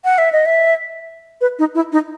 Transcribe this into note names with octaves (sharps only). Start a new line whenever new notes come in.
F#5
E5
D#5
E5
B4
D#4
E4
D#4